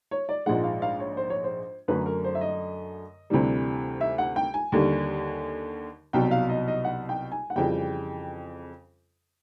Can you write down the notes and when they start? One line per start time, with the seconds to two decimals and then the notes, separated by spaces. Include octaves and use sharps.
0.11 C#5
0.29 D5
0.46 A#1 G#2 F3 G#3 F#5
0.64 F5
0.82 F5
1.00 C#5
1.17 C5
1.30 C#5
1.44 C5
1.88 F#2 D3 F#3 A3 B4
2.06 A#4
2.24 C5
2.35 E5
2.41 D#5
3.30 D2 C3 E3 G3
4.01 E5
4.18 F#5
4.36 G5
4.54 G#5
4.72 D#2 D3 G3
6.13 C2 B2 F#3 G5
6.31 F5
6.49 D#5
6.68 D#5
6.84 F#5
7.09 G5
7.32 G#5
7.50 F#5
7.56 F2 C#3 E3 G3 G5